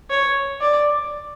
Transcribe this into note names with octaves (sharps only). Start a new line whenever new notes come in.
C#5
D5